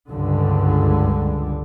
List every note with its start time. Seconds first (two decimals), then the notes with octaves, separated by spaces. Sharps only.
0.11 C#2 G2 D3